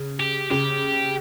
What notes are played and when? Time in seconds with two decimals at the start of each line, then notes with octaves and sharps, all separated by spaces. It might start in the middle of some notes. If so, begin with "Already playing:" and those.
Already playing: C#3
0.20 G4
0.51 C#3 G4